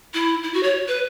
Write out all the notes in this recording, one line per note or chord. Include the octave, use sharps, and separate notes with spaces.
E4
E4
F#4
C#5
B4